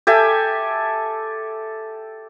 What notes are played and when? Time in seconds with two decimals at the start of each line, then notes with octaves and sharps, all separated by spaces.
0.07 G4 A4 E5 G#5